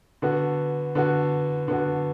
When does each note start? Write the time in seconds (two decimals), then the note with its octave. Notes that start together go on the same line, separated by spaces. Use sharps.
0.22 D3 B3 F#4
0.95 D3 B3 F#4
1.68 D3 B3 F#4